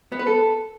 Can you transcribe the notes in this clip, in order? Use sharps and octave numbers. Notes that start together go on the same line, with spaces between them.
B3
B4
A4